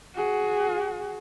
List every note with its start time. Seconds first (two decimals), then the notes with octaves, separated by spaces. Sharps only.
0.15 F#4 G#4